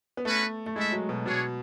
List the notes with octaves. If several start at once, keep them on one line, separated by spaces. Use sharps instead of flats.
B3
A3 C#4 F#4 B4
A3
G#3 E4 A4 E5
F#3
B2
B2 D4 G#4 C#5